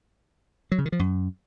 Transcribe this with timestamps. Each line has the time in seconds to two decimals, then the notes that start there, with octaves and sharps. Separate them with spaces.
0.72 F#3
0.79 C#3
0.85 D#3
0.92 F3
0.99 F#2